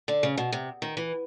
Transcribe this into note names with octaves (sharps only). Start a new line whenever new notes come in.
D3
C#3
B2
C3
D#3
E3